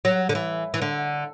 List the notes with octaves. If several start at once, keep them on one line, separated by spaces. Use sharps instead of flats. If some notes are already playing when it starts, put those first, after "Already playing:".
F#3
D3
E3
E3
D3